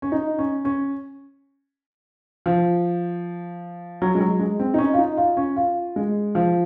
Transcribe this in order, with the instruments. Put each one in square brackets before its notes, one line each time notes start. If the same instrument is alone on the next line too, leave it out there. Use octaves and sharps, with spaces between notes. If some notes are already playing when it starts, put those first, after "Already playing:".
[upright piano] C#4
D#4
C#4
C#4
F3
F#3
G#3
F#3
G#3
C4
D#4
C#4
F4
D#4
F4
C#4
F4
G#3
F3